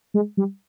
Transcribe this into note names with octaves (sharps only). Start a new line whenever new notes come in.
G#3
G3